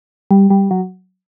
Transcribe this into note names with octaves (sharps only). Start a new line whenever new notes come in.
G3
G3
F#3